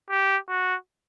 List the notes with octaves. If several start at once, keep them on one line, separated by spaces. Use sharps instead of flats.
G4
F#4